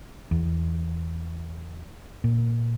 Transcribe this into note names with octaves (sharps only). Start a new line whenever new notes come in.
E2
A#2